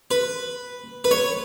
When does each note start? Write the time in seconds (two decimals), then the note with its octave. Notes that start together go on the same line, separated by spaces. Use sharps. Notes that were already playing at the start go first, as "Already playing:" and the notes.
0.11 B4
1.04 B4
1.11 C#5